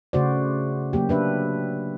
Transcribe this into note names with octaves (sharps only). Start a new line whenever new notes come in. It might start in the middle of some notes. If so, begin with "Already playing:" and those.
C#3 A3 F#4 C5 D5
F#3 A#3 G4
D4 B4 E5